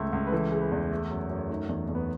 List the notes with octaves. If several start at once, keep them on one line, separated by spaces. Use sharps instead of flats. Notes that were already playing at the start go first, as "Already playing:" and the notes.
Already playing: C#2 A3
C#2
B4
E3 A4
G#3
B4
E2
A3
F#2
F#2
A3 D#4
E2
E2
B3